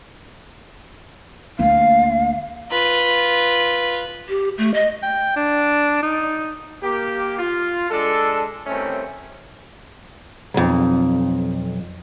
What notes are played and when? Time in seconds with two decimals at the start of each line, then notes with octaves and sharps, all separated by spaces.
1.59 D2 A#3 F5
2.71 F4 B4
4.29 G4
4.58 A3
4.74 D#5
5.03 G5
5.36 D4
6.03 D#4
6.83 A#3 G4
7.39 F4
7.90 G#3 D4 A4
8.67 C2 D#3 A3 C4 C#4
10.54 B1 F2